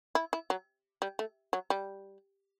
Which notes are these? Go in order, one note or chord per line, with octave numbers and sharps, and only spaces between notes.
E4
E4
F#3
G3
A3
F#3
G3